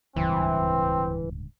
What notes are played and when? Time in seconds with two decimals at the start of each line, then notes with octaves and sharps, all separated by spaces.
0.16 D1 C#2 G2 E3 C4